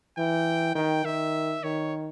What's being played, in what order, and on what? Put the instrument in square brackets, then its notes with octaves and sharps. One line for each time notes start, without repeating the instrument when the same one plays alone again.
[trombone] E3 [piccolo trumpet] G5
[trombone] D#3 [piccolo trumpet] G5
[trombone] D#3 [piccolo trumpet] E5
[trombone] D#3 [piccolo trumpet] C#5